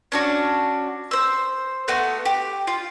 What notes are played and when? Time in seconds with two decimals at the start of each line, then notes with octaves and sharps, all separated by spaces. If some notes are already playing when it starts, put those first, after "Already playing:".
0.12 C#4 D4 F#4
1.11 C5 E6
1.88 A3 B3 F#4 C6
2.25 G4
2.67 F4